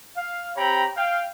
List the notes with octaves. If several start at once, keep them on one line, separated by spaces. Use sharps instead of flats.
F5
C4 G4 C#5 G5 A#5 B5
F5 G5